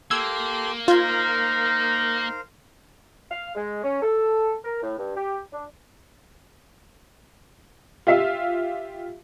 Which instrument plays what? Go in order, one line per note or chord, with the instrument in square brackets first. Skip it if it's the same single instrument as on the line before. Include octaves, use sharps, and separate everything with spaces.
[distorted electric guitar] A#3 [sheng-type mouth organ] G4 A4 C6 [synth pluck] E6 G#6
[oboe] D#4 [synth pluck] F4 G#6 [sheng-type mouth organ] A#4 C5 F5
[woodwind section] F5
G#3
C#4
A4
A#4
A2
G2
G4
D4
[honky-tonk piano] F4 G4 E5 F5